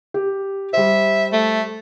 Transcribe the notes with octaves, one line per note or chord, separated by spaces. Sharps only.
G4
G3 C5 E5
A3